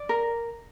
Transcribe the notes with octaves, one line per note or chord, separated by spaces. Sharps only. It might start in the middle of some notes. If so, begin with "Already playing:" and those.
Already playing: D5
A#4